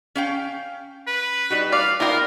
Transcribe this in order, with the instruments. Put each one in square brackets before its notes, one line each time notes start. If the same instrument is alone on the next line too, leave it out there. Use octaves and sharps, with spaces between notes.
[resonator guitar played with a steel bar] C#4 F5 G5
[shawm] B4
[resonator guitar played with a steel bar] G3 D#4 F#4
[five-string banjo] D5 [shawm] F5
[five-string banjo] B3 G5 [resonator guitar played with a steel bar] D#4 F4 D5 [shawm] A#4